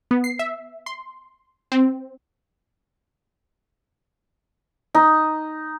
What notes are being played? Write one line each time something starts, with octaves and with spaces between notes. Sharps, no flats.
B3
C7
E5
C6
C4
D#4